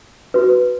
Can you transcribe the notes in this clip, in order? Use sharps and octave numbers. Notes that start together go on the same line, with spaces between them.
F#4 B4